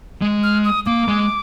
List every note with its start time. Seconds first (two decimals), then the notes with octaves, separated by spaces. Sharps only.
0.22 G#3
0.43 F6
0.65 D#6
0.86 A#3 D6
1.08 G#3